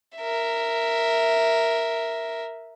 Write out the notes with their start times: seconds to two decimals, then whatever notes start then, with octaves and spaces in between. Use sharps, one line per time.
0.17 A#4 E5